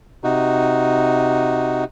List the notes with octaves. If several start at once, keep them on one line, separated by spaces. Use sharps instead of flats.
C3 D#4 F#4